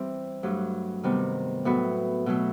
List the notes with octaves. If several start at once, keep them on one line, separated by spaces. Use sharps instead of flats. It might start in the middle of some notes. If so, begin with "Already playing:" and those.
Already playing: E3 G3 C4 E4
G2 F#3 A3
C3 D#3 G3 B3
A2 F#3 B3 F#4 B4
B2 F#3 A3